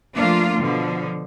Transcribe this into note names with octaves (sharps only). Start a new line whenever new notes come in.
F3 A3 A#3 D4 F4
B2 D3 F3